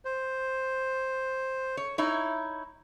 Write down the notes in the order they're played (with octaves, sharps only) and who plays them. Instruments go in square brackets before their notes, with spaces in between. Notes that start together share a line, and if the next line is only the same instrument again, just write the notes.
[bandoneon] C5
[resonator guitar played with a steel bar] C#5
D#4 E4 C#5